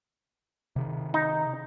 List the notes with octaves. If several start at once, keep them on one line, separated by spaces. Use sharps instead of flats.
C3 D#3
D#4